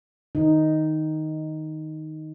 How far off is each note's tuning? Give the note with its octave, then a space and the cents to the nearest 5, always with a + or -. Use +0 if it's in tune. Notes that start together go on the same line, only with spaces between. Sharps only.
D#3 +0 D#4 +0